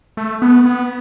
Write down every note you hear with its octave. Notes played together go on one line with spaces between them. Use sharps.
A3
B3
B3